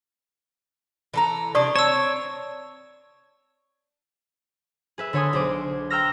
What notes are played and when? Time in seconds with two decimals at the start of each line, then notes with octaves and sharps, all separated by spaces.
1.14 E3 A4 A#5
1.55 C3 G3 D4 D5 C#6 D#6
1.76 C4 C#5 A5 E6
4.98 G#4 B4 E5
5.13 D3 B4 C#5 G#5 C6 D#6
5.33 B1 G#4 C5 D6 D#7
5.90 G5 A#5 C6 E6 F6 A#6